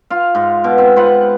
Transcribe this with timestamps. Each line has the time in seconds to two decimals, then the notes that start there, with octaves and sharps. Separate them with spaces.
0.10 F4 F5
0.35 G#2
0.64 B2
0.78 C4 E5
0.96 C4 F4 B4 F#5